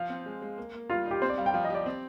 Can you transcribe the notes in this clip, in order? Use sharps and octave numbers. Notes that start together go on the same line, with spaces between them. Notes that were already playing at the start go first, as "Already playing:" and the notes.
Already playing: F3 F5
C4
G#3
G#3
A#3
A#3
G3 F4
D#4 G4
C4 C5
D5
G3 F5
G5
F3 F5
D#5
G4 D5
C4